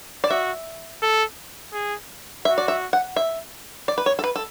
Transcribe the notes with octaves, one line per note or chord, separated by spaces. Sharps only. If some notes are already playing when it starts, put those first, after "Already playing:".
D5
F#4 E5
A4
G#4
F#4 E5
D5
E5
F#5
E5
D5
B4
C#5
A4
B4
A4